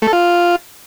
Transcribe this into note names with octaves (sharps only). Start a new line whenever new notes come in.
A3
A4
F4